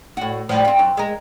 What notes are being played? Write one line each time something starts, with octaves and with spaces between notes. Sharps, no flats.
A2 F#4
A2 F3 G3
C4 F4
F#2
G#3 A#4